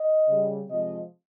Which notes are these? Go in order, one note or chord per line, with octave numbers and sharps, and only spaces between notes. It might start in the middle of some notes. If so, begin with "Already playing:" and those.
Already playing: D#5
C#3 G3
C3 F3 G#3 D#5